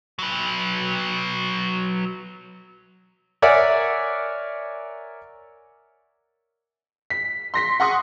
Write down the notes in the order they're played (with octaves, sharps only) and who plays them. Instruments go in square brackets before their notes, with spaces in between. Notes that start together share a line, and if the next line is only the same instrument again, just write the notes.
[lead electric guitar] F#3 B4
[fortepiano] A#4 C#5 D5 E5 F#5 G#5
[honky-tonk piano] B6
C6 A#6 B6
F#5 C6 C#6 D#6